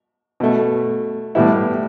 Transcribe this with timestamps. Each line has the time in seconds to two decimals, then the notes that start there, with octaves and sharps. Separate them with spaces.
0.40 B2 A3
1.35 A2 G3 B3 E4